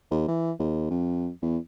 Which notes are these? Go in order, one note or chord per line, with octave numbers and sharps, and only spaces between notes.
D#2
E3
D#2
F2
E2